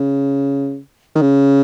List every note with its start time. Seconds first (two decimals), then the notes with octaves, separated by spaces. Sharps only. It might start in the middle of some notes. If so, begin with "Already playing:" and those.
Already playing: C#3
1.15 D#3
1.22 C#3